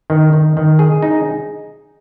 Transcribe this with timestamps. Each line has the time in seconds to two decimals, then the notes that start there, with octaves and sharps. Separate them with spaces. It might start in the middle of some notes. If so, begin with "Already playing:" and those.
0.10 D#3
0.33 D#3
0.57 D#3
0.79 G#4
1.02 D#4